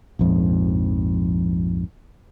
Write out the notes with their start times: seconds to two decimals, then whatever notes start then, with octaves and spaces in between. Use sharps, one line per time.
0.19 A#1 F2 G#2